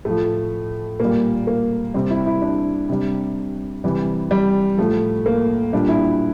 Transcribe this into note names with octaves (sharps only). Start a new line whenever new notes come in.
A2 F3 A3
A#2 G3 A#3
A#3
C3 G3 C4
E4
E4
D4
C3 G3
C3 E3 G3
G3
A2 F3 A3
A#3
A#2 G3 D4
E4